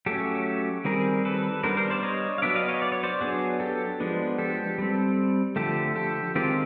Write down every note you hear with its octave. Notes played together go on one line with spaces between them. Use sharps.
F#3 A3 C#4 G4 A4
D#3 G3 C4 G#4 A#4
A4 B4
G3 B3 D4 A#4 C5
A#4 C5
C5 D5
C#5 D#5
F5
F#3 B3 D4 D5 E5
D#5 F5
C#5 D#5
D5
C#5
C5 D5
F#3 B3 D4 F#4 G#4
G4 A4
F3 G#3 B3 D4
G4 A4
G3 C4
D3 F3 A3 G4 A4
G4 A4
D#3 G#3 C4 F4 G4